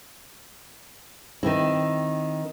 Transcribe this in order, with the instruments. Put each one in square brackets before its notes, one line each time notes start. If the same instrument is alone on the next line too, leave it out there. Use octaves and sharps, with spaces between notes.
[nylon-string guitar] D#3 C4 E4